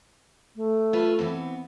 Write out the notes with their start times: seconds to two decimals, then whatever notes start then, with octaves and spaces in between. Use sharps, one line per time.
0.56 A3
0.93 F4 B4 E5
1.19 E3 B3 C4